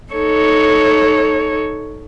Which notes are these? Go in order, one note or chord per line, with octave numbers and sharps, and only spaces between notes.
D#4 A4 C#5